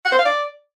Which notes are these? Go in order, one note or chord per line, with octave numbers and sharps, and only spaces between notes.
F#5
C5
F5
D5